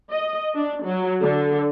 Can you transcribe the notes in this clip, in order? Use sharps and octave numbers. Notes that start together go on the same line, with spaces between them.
D#5
D4
F#3
D3